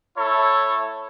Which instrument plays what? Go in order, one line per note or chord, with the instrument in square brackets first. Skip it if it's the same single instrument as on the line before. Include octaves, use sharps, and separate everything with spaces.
[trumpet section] A3 E4 A4 C#5